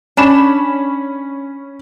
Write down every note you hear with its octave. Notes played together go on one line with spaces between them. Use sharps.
C#4 D4 B5 E7